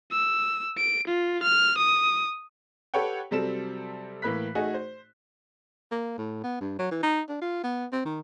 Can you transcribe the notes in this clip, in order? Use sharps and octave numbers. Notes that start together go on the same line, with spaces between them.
E6
D7
F4
F6
D#6
G4 A4 B4 C#5 F#5 G5
C3 F#3 G3 C4 A4 E7
A2 E3 A#3 B5 F#6 B6
A3 D#4 F#4 G#4
C5
A#3
A2
B3
G2
F#3
E3
D#4
D4
F4
B3
C4
D#3